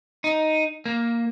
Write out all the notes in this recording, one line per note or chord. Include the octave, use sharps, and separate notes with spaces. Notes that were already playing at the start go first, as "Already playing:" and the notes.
D#4
A#3